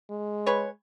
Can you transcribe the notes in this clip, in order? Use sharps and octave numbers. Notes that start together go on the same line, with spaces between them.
G#3
G#4 B4 C#5